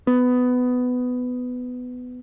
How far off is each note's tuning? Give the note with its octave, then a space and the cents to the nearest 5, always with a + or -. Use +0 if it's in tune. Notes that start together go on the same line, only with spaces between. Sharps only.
B3 +15